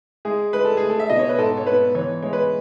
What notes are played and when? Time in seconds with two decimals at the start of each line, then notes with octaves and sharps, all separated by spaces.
0.25 G#3 G#4
0.53 G#3 B4
0.65 A4
0.77 A3 G#4
0.90 A4
1.00 E5
1.10 B2 D#5
1.19 C#5
1.29 B4
1.38 G#2 A4
1.57 C#5
1.66 B3 B4
1.95 E3 C#5
2.23 G#3 C#5
2.33 B4